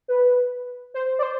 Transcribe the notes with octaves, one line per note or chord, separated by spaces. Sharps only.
B4
C5
D5
C5